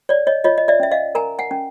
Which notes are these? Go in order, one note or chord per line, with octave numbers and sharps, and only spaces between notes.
C#5 D5
C#5 D#5
F4 C#5 D#5
D#5
D5 E5
C#4 E5
D#5 F5
A#4 G#5 A#5
F#5 G#5
C#4